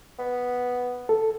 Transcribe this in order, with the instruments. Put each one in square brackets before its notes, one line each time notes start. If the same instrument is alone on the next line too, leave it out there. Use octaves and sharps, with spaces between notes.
[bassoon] B3
[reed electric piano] A4